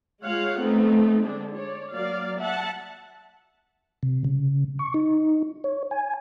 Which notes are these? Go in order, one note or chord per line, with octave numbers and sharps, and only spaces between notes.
G#3 F4 C#5 F5 F#5
A3 B3 C4 D#4
D3 G#3 D4
C#5 D5
F#3 A#3 D5 F5
E5 F#5 A5
C3
C#3
C#6
D#4
C#5
G#5